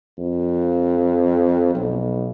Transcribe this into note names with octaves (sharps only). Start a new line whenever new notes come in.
F2
B1